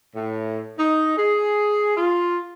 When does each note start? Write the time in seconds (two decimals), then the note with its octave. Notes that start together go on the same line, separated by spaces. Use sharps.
0.15 A2
0.79 D#4
1.18 G#4
1.97 F4